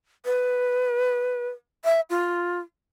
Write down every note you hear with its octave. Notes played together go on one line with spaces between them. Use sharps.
B4
E5
F4